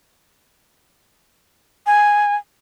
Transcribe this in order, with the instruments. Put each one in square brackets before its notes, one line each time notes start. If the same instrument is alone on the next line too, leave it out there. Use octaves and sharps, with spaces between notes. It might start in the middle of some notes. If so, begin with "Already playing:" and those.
[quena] G#5